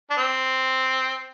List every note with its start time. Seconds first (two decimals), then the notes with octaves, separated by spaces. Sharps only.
0.10 D4
0.17 C4